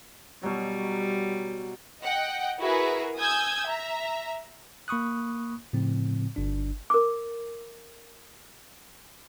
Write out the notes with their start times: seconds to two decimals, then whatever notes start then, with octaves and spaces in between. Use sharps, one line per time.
0.43 B2 F#3 G3
2.03 D#5 F#5 G5
2.60 E4 F#4 G#4 A#4 B4
3.18 G#5 D#6 E6 G6 G#6
3.67 E5 A#5
4.88 A#3 B5 C#6 D#6 F#6
5.73 A2 C#3 F3 C4
6.36 G1 D4
6.90 A#4 D6